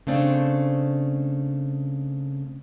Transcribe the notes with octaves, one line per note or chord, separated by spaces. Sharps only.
C#3 A3 C4 D4